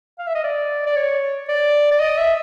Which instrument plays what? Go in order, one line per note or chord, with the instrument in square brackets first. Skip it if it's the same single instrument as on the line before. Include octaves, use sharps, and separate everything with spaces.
[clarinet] F5
E5
D#5
D5
D5
C#5
D5
D5
D#5
E5